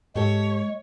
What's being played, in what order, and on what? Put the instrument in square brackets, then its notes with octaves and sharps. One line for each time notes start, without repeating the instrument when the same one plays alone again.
[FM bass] G#2 [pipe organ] G#3 [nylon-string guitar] G4 A4 [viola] C#5